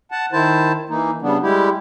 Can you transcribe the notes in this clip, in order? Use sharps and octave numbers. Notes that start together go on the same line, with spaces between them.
F#5 A5
D#3 E4 C5 A5
E3 A#3 D#4
C#3 G3 B3 D4
G3 G#3 E4 G4